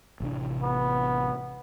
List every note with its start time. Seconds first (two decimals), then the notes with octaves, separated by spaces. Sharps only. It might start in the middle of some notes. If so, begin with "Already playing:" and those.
0.20 A1 C3 D4
0.63 B3